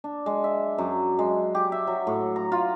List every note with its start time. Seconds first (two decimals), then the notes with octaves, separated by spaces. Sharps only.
0.04 D4
0.26 G#3
0.44 E5
0.78 F#2
1.19 G#3
1.55 G4
1.72 E5
1.87 F#3
2.07 A2
2.36 A#5
2.52 F4